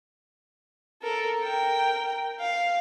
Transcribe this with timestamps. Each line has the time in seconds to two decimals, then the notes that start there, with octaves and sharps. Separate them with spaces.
1.02 A4 A#4
1.41 A#4 G5
2.40 F5